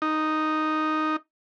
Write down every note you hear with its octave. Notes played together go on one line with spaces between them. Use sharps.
D#4